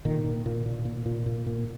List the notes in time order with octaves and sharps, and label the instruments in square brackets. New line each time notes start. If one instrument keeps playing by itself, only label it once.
[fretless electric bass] A#2 D#3
A#2
A#2
A#2
A#2
A#2
A#2
A#2